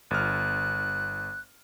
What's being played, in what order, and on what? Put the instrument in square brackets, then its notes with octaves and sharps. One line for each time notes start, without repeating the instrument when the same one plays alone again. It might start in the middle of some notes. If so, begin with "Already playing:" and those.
[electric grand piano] G1 F6 [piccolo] F#6